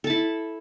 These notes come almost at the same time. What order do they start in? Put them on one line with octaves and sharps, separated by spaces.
A4 A5 E4